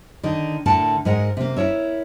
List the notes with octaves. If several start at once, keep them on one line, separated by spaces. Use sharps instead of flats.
D3 D#3 D#4
A2 D3 A#4 F#5 A5
G#2 G#3 A#4 F#5
C3 A#3
E4 A#4 C#5 E5